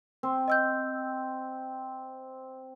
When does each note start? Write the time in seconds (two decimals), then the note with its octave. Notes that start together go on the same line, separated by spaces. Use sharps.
0.23 C4
0.48 D#5 E6 G6